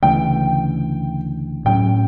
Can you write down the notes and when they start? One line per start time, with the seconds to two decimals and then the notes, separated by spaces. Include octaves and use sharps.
0.03 D2 C#3 E3 A3 G5
1.65 A2 F#3 C#4 G5